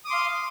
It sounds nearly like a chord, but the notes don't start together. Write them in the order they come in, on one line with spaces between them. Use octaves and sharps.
D#6 D6 C6 F5